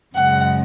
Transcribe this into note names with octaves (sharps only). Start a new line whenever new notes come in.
F#2 C#3 G#3 F#5